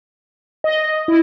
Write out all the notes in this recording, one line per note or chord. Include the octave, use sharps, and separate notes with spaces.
D#5
E4